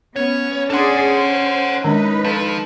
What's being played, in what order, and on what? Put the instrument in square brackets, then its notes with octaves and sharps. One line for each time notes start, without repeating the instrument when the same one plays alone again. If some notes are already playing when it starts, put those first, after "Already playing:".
[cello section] B3 [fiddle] C#4 [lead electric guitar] C#5
[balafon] D4 C6 [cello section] G#4 D5 [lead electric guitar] A4 F#5
[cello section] C5
[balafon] D#3 G#3 D4 [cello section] D#4 B4
[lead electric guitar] F3 [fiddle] A4